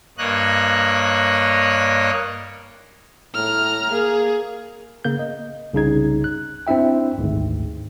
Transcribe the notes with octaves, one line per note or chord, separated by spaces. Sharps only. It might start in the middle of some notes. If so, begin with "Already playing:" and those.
G2 A#3 C#5 D#5 F#6
A2 A#5 F6
A#3 G#4
C#3 A#3 G6
D#5
C2 C#3 D#4 G#6
F#6
C4 D4 E4 E5 G5
G#1 D2 G#2